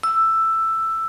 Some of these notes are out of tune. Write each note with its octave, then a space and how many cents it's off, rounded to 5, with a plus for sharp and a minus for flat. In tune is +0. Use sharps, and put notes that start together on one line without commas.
E6 +10